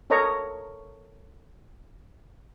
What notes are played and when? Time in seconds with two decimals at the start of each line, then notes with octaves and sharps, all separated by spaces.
0.10 A4 A#4 C#5 D#5 A#5 C#6